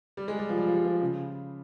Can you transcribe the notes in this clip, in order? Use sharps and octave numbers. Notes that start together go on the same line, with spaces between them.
G3
G#3
G3
F3
G3
F3
G3
F3
C#3